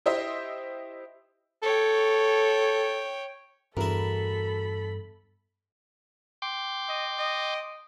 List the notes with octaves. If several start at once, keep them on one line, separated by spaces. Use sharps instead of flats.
E4 G4 C5 D#5 E5
A4 C#5 G5
E2 G2 E4 F#4 A4 A#4 B5
G5 C6 D6
D#5
D#5